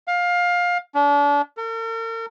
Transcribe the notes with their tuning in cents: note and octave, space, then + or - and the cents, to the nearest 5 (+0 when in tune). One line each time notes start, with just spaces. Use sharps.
F5 +20
D4 -35
A#4 -45